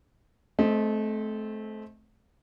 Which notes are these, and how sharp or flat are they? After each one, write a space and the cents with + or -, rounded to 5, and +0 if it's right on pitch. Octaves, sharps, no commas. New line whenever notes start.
A3 -25 C4 +0 D#5 +0